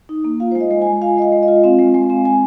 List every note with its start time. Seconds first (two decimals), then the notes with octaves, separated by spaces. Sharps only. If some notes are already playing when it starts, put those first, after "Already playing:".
0.09 D#4
0.25 A#3
0.40 F4 F5
0.51 G#3 C5
0.60 D#5
0.71 G#3
0.82 G#3 G#5
1.02 F4 F5
1.17 G#3 D#5
1.22 F5
1.32 G#3
1.43 D#5
1.48 F4
1.64 C4 F5
1.79 G#3
1.94 G#3
2.10 C4
2.25 G#3 G#5